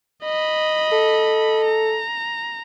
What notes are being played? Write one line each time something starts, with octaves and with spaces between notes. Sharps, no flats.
D#5 B5
A4
A#5